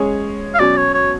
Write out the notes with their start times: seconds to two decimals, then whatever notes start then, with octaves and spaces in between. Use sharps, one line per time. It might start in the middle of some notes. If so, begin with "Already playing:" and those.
Already playing: G#3 C#4 G#4 C#5
0.54 F5
0.59 B2 F#3 C#4 D5
0.77 C#5
0.94 C#5